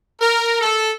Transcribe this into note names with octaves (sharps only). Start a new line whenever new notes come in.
A#4
A4